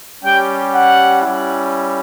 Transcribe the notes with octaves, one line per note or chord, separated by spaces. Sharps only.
G3 C#4 G4 G5
F#5
G3 C#4 E4